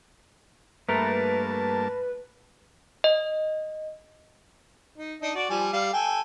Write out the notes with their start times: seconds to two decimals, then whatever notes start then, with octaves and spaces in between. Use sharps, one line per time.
0.89 G2 A3 A#3 A#4 B4 A5
3.04 D#5
4.98 D#4
5.22 D4 D#4 D#5
5.35 F#4 D5
5.50 F3 G3 G#5
5.73 G3 F5
5.93 A4 G5 G#5